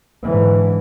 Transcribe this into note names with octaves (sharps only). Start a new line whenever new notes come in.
G#2 D3 E3